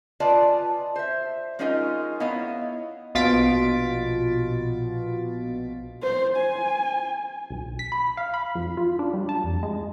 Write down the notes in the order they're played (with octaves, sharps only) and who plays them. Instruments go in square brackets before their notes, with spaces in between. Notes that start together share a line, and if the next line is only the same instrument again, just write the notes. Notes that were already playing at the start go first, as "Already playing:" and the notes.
[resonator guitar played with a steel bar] F4 B4 D5 D#5 G#5 A5
C5 E5
G#3 C#4 D#4 F4 A#4 D#5
B3 E4 C#5 D#5 F5
[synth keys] A#1 B2 F4 A6 B6 D7
[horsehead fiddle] C5
G#5
[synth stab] B1
B6
B5
F5
B5
F2
F4
D4
G3
A5
F2
G#3